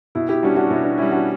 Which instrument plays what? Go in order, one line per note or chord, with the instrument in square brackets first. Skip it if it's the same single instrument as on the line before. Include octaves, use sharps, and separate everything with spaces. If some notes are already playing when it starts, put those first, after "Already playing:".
[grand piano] B2 [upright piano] E4
[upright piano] E4 G4
[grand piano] G3 C#4 [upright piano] D4 F#4
[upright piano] D4 F#4
[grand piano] B2 [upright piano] E4
[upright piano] D4
[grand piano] G3 C#4 [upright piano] E4
[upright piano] D4 F#4